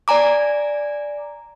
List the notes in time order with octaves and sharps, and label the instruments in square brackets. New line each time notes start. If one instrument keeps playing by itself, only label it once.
[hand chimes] D5 G#5 A#5 D6